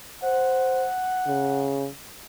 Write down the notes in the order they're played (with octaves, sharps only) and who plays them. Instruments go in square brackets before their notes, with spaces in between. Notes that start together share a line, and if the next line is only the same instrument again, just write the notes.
[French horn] C5 [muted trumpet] F#5
[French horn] C#3